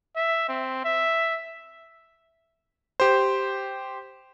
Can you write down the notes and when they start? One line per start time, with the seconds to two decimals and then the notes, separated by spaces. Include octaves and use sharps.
0.16 E5
0.49 C4
0.84 E5
3.00 G4 C5